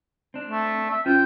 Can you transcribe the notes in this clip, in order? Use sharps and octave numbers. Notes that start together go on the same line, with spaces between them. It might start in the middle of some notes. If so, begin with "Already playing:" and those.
C4 D4
A3
E5
C#4 F4 C5 G5